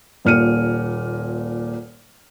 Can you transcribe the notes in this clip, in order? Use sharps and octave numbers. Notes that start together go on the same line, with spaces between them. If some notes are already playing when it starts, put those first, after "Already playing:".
D#1 A#2 F6 C#7 D#7